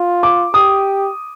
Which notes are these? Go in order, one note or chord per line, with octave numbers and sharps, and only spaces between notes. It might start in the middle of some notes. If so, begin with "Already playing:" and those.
Already playing: F4
D6
G4 D#6